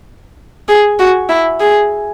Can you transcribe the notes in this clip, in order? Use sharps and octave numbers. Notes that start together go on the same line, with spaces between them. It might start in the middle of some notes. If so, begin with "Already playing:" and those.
G#4
F#4
E4
G#4